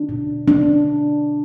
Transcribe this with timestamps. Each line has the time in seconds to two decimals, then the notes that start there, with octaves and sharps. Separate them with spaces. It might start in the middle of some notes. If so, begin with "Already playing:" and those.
Already playing: D4
0.09 B2
0.48 D4